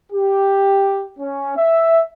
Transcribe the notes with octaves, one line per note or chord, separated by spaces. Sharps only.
G4
C#4
E5